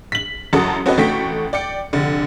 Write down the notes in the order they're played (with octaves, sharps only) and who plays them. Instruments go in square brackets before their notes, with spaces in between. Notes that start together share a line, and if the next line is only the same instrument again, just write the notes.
[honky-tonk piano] B6 F#7
A1 F#2 F#4 A4 D#6
C4 C#4 F#4 A4 B4 D#5
A1 A3 F#4 G5 C#6 B6
D5 G5 C#7
F1 D3